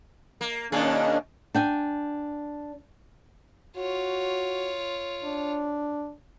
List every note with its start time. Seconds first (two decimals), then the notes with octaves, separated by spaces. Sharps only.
0.41 A#3
0.72 B2 D#3 A#3 C#4 D4 G#4
1.55 D4 G5 G#5
3.77 F4 F#4 C#5
5.24 D4